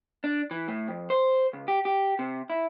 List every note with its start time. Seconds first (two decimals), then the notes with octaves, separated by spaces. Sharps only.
0.24 D4
0.51 E3
0.68 A2
0.88 F2
1.10 C5
1.53 C#2
1.68 G4
1.85 G4
2.19 C3
2.50 E4